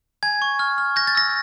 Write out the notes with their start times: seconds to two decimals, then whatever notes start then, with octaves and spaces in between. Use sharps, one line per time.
0.23 G#5 G#6
0.42 C#6
0.59 F6
0.78 F6
0.96 G6 A#6
1.07 A6
1.15 E6 A#6